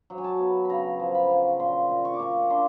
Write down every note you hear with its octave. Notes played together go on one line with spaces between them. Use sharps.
F#3
G#5
A5
B3
C#3 A#5 B5
F3
B5
C#3
A#2 C6
A#2
C#6
D6
A#2 C#6
D4 C6